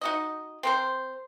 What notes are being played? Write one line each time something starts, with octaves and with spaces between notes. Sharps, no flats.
D#4 F#4 D#5
C4 A#4 C5